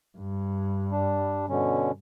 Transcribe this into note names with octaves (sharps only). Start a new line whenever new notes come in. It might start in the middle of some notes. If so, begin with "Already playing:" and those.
G2
G3 D4
B2 D3 C#4